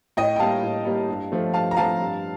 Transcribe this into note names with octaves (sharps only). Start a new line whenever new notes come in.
A2 D#5 G5
G5
G3 A#3 F5 A5
A2
G3 A#3
G2
F3 A3
G2 F5 A5
A#5
F3 A3 F5 A5
G2